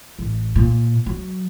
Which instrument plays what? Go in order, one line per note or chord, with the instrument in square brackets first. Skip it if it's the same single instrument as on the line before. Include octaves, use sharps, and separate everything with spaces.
[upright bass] A1
A#2
F#3